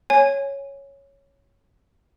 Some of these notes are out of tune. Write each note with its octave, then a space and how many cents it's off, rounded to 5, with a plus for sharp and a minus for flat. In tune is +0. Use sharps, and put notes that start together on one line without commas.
C#5 +0 G#5 +0